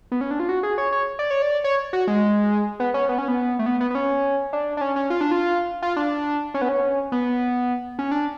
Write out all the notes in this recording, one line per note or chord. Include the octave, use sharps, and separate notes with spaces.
B3
C#4
D4
F4
F#4
G#4
C#5
C#5
D5
C#5
D5
C#5
F#4
G#3
B3
C#4
B3
C#4
B3
A3
B3
B3
B3
C#4
D4
D4
C#4
C#4
F4
D4
F4
F4
D4
C#4
B3
C#4
B3
C#4
D4